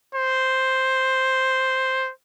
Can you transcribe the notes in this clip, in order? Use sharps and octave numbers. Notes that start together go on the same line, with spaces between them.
C5